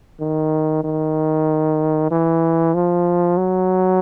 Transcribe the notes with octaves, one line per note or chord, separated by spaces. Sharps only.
D#3
D#3
E3
F3
F#3